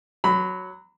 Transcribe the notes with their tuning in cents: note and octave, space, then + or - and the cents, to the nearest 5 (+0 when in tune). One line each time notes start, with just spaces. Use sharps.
F#3 +0 B5 +15